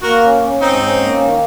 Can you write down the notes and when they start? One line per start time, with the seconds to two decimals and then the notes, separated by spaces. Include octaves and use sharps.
0.03 A#3 F#4 A#4
0.23 C#4
0.42 C#4
0.61 G#2 C4 D#4
0.81 C#4
1.01 A#3
1.20 D#3